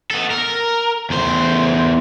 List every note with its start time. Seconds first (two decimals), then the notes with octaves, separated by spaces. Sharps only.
0.11 B3 A4
0.31 A#4
1.10 E2 C5